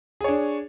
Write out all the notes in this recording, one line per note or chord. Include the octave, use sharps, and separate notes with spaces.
D4 G#4 C#5